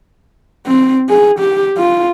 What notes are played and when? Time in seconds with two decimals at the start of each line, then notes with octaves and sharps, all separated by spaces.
0.67 C4
1.09 G#4
1.40 G4
1.78 F4